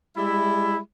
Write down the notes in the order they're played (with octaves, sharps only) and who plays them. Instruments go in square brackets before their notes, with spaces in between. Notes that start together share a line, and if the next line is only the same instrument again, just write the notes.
[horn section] G3 G#3 E4